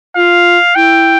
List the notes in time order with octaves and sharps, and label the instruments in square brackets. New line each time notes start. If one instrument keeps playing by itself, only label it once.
[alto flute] F4 [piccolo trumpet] F5
[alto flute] E4 [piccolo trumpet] G5